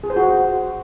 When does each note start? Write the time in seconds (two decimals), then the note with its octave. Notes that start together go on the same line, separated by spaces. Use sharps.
0.04 G#4
0.10 C5
0.16 F#4